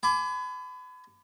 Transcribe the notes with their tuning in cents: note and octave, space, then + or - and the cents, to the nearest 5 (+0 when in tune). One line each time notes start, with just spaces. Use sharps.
G#5 +30 B5 +35 D6 +0